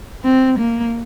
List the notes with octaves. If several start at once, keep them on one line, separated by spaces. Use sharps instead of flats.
C4
A#3